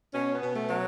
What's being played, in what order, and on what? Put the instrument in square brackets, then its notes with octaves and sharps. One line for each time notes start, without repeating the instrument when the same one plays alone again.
[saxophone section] B2 C#4
B3
B2
A3
F#3